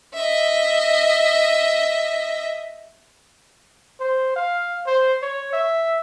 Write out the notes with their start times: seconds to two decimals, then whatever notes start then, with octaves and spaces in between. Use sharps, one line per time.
0.14 D#5 E5
4.00 C5
4.36 F5
4.87 C5
5.22 C#5
5.53 E5